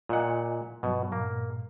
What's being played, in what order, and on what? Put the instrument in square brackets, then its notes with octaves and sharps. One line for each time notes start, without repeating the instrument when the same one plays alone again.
[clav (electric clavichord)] A#2 F#5 [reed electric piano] F4 D#5 G#5
[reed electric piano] G2 F#3 [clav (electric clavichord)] B2
[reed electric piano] G2 A#2 [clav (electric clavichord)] A#3